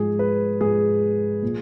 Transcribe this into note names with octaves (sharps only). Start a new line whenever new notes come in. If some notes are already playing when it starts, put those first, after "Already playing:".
Already playing: G#2 F3 G#4
B4
G#2 F3 G#4
A#2 F3